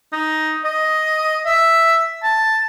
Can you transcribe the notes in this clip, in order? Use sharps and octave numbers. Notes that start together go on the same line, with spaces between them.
D#4
D#5
E5
A5